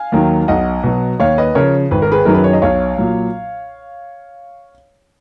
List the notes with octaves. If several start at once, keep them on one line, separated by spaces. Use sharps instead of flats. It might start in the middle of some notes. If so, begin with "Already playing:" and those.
Already playing: F5 G#5
D#2 D#3 F#3
B1 D#5 F#5
B2 F#3
D#2 C#5 F5
B4 D#5
C#3 F3 A#4 C#5
G#1 B4
A#4
G#4 B4
F#2 D#3 F#3 A#4
B4
C#5
D#5
B1 C#5 F5
A#2 F#3